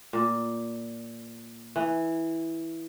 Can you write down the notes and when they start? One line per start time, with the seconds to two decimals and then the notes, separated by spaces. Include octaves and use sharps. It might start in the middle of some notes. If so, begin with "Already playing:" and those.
0.13 A#2
1.76 E3